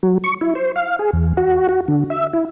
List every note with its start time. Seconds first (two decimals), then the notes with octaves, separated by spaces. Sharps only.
0.03 F#3
0.24 C#6
0.41 E4
0.55 C5
0.76 F5
0.99 G#4
1.13 E2
1.37 F#4
1.69 F#4
1.88 D3
2.10 E5
2.33 E4